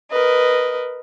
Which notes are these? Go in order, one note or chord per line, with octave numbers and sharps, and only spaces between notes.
A#4 B4 D#5